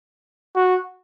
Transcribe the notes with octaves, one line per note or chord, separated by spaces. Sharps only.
F#4